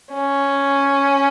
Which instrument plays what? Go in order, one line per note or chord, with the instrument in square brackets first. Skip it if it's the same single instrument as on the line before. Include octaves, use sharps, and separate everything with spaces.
[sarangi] C#4